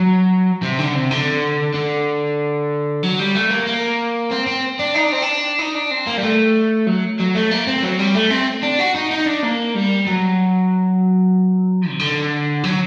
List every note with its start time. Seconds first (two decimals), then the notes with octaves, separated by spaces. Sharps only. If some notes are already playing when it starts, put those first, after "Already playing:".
Already playing: F#3
0.63 C3
0.79 D3
0.95 C3
1.11 D3
1.74 D3
3.03 F#3
3.19 G3
3.35 A3
3.50 A#3
3.66 A#3
4.31 C4
4.47 C4
4.79 D4
4.95 D#4
5.04 D4
5.12 C4
5.22 D4
5.59 D#4
5.75 D4
5.91 C4
6.07 A#3
6.17 G3
6.23 A3
6.87 F#3
7.20 F#3
7.35 A3
7.51 A#3
7.67 C4
7.83 F#3
7.99 G3
8.15 A3
8.30 C4
8.63 D4
8.80 F#4
8.95 D#4
9.12 D#4
9.27 D4
9.44 A#3
9.75 G3
10.07 F#3
11.90 C3
11.99 D3
12.64 F#3